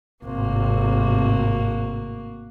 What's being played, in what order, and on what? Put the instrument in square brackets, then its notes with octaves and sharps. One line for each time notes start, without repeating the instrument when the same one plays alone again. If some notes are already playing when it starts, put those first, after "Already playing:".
[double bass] G#1 [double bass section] A2 C3 [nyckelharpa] A#3 F#4